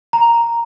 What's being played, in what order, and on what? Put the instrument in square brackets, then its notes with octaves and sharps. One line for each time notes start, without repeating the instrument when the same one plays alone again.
[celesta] A#5